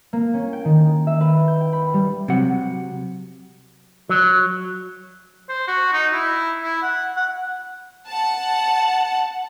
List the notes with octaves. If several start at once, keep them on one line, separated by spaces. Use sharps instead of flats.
A#3
C#4
G5
D#3
E5
B4
G6
G5
B5
G3
C3 F#3 F#5
F#3
C5
F#4
D#4
E4
E4
F#5
F#5
F#5 A5